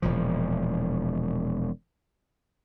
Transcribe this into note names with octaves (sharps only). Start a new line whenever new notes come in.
E1 A#2 F3